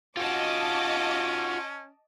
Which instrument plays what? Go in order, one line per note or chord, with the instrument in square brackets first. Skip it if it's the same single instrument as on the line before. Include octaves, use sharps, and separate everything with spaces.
[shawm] C#4 [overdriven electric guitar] F4 F#4 [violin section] D#5 A5 D6